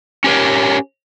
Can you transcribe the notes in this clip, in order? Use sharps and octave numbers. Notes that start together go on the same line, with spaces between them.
C#4 G4 A#4 C#5